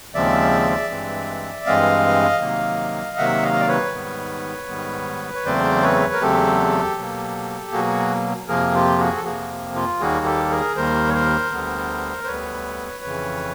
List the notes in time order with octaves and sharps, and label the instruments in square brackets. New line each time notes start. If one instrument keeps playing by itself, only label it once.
[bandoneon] D#2 C#3 F3 G#3 C4 D5 E5
G2 E3 G#3 C4
G2 E3 G#3 C4 D#5 F5
C3 D#3 F#3 A#3
C3 D#3 F#3 A#3 E5 F#5
D#5 F5
D#5
D5
B4 C#5
G#2 D#3 G3 B3
G#2 D#3 G3 B3
C#5
E2 C#3 F#3 A3 C4 C5 D5
B4 C#5
A#4
E2 C#3 F#3 A3 C4 G4 A4
B2 F#3 A#3
B2 F#3 A#3 F#4 G#4
F2 C3 F3 A#3 G#4 A#4
F4 G4
F#4 G#4
A4
F2 C3 F3 A#3 F#4 G#4
F4
D#2 D#3 G3 A#3 F#4 G#4
G4 A4
G#4 A#4
D#2 D#3 G3 A#3 A#4 C5
C#5
A#4 C5
D2 D3 G3 B3
C5
D2 D3 G3 B3 B4 C#5
F2 C#3 E3